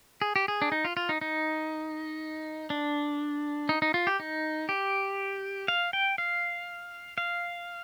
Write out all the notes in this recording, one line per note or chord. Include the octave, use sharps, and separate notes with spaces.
G#4
G4
G#4
D4
D#4
F4
F4
D#4
D#4
D4
D#4
D#4
F4
G4
D#4
G4
F5
G5
F5
F5